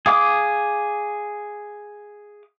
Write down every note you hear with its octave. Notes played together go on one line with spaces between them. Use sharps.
G#4 F5 D6 D#6